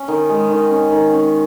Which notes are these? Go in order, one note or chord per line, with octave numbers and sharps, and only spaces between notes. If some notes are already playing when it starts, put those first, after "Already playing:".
Already playing: C#4
D#3
G#3
D#3
C#4
D#3
C#4